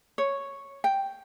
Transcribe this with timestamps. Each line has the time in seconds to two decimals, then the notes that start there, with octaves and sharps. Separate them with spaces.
0.18 C#5
0.84 G5